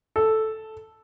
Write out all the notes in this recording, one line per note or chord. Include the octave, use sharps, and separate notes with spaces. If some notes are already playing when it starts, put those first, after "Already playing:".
A4